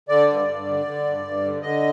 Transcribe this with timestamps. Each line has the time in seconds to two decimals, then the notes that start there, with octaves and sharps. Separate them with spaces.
0.09 D3 D5
0.28 G2
0.47 G2
0.66 D3
0.85 D3
1.05 G2
1.24 G2
1.44 D3
1.62 D3 D#5